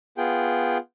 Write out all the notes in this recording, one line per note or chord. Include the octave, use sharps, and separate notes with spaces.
B3 F4 G#4 G5